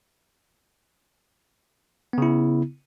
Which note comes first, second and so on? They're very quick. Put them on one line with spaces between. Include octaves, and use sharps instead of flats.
B3 C#3 E4